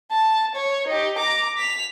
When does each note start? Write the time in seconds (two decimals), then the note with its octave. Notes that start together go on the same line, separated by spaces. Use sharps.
0.12 A5
0.55 C#5
0.87 D#4 G4
1.18 A#5 D6
1.58 B6 F7